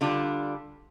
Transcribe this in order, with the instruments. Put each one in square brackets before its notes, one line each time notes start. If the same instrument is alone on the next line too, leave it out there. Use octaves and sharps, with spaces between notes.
[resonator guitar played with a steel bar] D3 G3 D4 F4